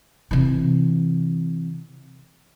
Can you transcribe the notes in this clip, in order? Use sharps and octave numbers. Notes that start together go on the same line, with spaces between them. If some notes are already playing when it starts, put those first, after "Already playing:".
C3 E3